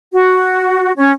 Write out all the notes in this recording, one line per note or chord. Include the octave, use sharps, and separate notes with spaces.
F#4
C#4